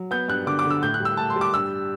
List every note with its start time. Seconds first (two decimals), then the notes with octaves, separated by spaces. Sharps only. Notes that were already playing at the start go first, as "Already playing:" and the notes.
Already playing: F#3
0.11 B3 G6
0.28 G2 F#6
0.46 D3 D6
0.59 D6
0.65 D3
0.71 E6
0.82 A2 G6
0.94 F#6
1.00 G3
1.05 E6
1.17 A2 A5
1.30 C6
1.36 G3
1.41 D6
1.54 G2 E6